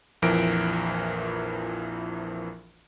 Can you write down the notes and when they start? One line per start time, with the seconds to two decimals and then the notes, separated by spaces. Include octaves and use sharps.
0.22 A#1 F2 E3 F3 A#4 D7